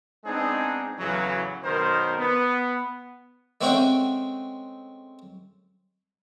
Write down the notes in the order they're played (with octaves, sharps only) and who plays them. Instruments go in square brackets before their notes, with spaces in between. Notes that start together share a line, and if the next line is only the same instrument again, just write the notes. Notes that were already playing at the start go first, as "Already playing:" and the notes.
[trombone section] G#3 B3 C4 D4 D#4 G#4
E2 A2 C#3 E3 F#3
B1 B2 D#3 A#4 C5
B3
[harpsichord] G#3 A3 C4 C#4 F#5 G5